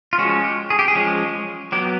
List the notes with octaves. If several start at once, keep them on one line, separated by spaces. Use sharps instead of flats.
F4
F3 G#3 C#4 F#4
G4
G#4
G4
G#4
F3 G#3 C#4
F#3 B3 G4